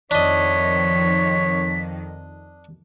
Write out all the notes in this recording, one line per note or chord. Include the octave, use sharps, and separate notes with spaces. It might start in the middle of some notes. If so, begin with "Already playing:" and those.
F2 D#3 D4 C#5 D#5 B6